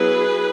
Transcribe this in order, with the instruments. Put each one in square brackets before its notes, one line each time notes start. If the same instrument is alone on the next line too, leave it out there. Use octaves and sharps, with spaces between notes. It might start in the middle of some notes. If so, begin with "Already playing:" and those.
Already playing: [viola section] F#3 B3 E4 G#4 B4